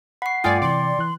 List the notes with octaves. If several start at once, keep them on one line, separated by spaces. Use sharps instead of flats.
F#5 B5 C#6 C7
G2 A3 F4 D5 G5 G#5 D#6 A6
C3 E3 D5 C6
E3 F#6